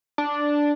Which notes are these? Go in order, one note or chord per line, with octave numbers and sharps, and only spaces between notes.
D4